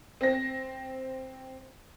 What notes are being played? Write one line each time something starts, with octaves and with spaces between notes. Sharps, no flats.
C4 A#6